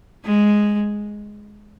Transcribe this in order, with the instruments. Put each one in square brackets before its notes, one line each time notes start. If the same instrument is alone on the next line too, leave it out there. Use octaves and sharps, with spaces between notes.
[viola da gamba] G#3